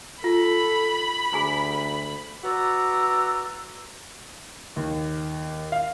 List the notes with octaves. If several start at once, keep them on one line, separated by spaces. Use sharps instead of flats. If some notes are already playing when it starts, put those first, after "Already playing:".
F4 A4 B5
D2 G#4 G#5 A#5
F#4 B4 D5 A#5 E6
D#2
F5